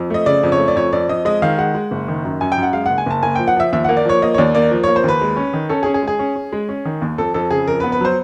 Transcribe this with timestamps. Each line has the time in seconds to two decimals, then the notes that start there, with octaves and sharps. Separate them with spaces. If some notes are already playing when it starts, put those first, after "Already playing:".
Already playing: F2
0.10 A3 D#5
0.26 C#3 D5
0.43 F2
0.52 C#5
0.59 A3
0.68 D5
0.76 F2 C#5
0.92 F2 D5
1.09 F2 D#5
1.25 G#3 D#5
1.42 D#3 F5
1.58 G#3 F#5
1.74 G#3
1.91 F#1
2.08 D#3
2.24 F#2
2.41 F#2 G#5
2.52 G5
2.58 F#2
2.63 F#5
2.73 G#3 F5
2.86 F#1 F#5
2.98 G#5
3.06 F#1 A5
3.23 A#3 G#5
3.35 F3 G5
3.48 F#5
3.56 F3 E5
3.73 D#2 E5
3.85 A#3 F#5
3.97 D5
4.05 F3 C#5
4.22 A#3 D#5
4.34 C#5
4.38 D#2 D5
4.55 A#3 D5
4.71 F3
4.84 A#3 C#5
4.96 C5
5.04 D#2 B4
5.21 G#3
5.36 C#4
5.54 D#3
5.69 C#4 A4
5.83 G#4
5.86 C#4
5.94 G#4
6.02 G#3
6.07 G#4
6.19 C#4
6.36 C#4
6.52 G#3
6.69 C#4
6.85 D#3
7.02 D#2
7.18 F2 A4
7.34 F2 A4
7.50 C#3 G#4
7.68 F2 A#4
7.80 B4
7.84 B3
7.92 B4
8.01 F#3 C5